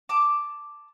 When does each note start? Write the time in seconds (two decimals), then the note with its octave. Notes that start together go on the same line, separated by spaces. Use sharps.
0.09 A5 D6